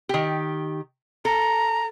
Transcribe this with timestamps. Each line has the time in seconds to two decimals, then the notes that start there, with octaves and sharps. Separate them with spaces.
0.09 D#3 G4
1.25 A4 A#5